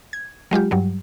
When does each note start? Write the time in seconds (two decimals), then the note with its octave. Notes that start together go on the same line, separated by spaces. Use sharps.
0.13 G#6
0.51 F#3 G#3 F4 G4
0.71 G2 F#3 G3